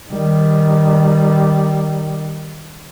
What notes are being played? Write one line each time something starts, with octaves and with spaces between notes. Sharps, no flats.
D#3 G3